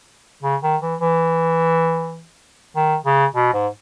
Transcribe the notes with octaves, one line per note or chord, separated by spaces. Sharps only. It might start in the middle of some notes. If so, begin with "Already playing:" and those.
C#3
D#3
E3
E3
D#3
C#3
B2
G#2